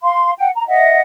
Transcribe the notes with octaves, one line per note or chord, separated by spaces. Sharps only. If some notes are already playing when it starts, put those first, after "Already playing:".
F5 C6
F#5 G5
A#5
D#5 E5 F#5